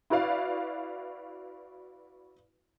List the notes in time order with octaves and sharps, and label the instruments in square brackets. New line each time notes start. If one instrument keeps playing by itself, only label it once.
[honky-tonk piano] E4 F#4 B4 D5 F5